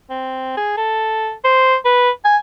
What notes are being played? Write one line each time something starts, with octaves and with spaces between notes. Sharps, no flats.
C4
G#4
A4
C5
B4
G#5